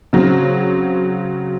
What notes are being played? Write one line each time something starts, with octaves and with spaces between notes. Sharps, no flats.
C#3 F#3 C4